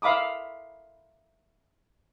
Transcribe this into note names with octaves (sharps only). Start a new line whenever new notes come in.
E5 F5 B5 D6 D#6